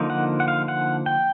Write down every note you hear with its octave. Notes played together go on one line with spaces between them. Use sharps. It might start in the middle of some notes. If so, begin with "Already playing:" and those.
Already playing: D3 F3 A#3 D#4
F#5
F#5
F5
F#5
G5